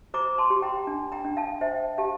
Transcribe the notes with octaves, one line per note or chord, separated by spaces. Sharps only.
C5 A#5 D6
A5 C6
G4
G5 A#5
D4
G5 A#5
D4
F5 A5
C5 E5 G5
G4 F5 A5